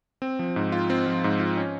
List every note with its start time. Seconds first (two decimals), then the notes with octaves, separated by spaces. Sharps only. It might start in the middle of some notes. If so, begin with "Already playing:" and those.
0.22 C4
0.39 F3
0.56 G#2
0.72 F4
0.90 C4
1.07 F3
1.24 G#2
1.40 F4
1.57 C#4